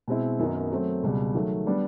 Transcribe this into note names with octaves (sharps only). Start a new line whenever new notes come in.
B2 G#3 C4 E4
F#2 D#3 F#3 B3 D#4
F#3 A3 C4
C#2 B2 G3
D#3 F#3 A3
G3 B3 D4